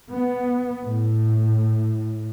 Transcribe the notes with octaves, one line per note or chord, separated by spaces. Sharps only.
B3
A2